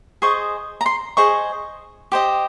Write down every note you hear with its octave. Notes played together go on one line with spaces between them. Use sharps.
G#4 C5 D#5 C#6
A#5
C6
G#4 C5 D#5 C#6
G4 C5 D#5